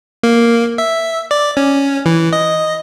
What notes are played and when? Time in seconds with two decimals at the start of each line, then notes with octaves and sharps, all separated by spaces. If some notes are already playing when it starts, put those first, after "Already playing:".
0.23 A#3
0.78 E5
1.31 D5
1.57 C#4
2.06 E3
2.33 D#5